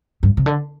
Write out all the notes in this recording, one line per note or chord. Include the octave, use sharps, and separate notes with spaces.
G2
C3
D3